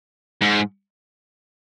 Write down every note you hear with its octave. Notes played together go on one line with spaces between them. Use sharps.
G#2